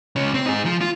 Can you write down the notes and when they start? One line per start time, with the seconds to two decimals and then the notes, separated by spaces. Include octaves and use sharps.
0.16 C#2 C#4
0.34 C4
0.46 D#4 G#4
0.65 F3
0.81 F4